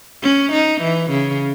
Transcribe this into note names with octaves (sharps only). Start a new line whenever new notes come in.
C#4
D#4
E3
C#3